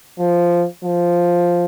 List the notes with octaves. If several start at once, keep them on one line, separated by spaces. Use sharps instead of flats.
F3
F3